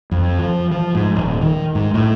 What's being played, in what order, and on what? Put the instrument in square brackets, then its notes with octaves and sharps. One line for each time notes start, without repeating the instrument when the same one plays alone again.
[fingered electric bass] F2
F3
F3
G#2
D#1
D#3
G#2
A2